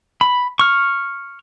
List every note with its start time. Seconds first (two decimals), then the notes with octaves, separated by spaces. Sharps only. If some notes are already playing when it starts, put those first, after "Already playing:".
0.21 B5
0.59 C#6 F6